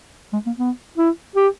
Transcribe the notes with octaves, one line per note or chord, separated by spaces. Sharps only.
G#3
A#3
B3
E4
G4